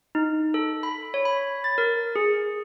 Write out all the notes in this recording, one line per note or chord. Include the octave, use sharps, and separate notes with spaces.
D#4
A4
B5
C#5
B5
A6
A#4
G#4